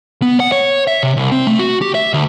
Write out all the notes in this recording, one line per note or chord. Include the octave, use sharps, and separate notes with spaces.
B3
F#5
C#5
E5
C3
C2
C4
A3
F#4
G4
E5
D2